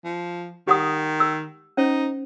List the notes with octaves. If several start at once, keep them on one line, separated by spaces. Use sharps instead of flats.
F3
D#3 G4 F#5 D#6
E6
C#4 D#4 C5